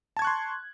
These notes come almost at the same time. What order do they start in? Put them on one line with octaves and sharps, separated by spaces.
A5 G#6 C#6 F#6 C6